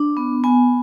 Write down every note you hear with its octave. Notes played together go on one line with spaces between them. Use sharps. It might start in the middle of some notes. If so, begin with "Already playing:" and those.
Already playing: D4
B3
B3 G#5